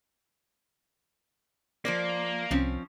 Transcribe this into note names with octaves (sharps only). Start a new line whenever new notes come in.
F3 A#3 C5 D5
C2 F3 C4 C#4